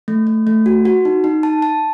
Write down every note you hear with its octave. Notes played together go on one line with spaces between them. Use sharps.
A3
A3
A3
F#4
F#4
D#4
D#4
A5
A5